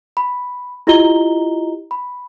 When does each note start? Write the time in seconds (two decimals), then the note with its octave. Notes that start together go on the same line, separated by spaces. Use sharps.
0.17 B5
0.87 E4 F4 G4 D#5 A#5 G7
1.91 B5